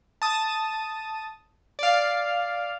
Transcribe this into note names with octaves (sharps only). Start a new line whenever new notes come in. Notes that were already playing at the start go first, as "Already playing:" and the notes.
A5 D#6
D5 F5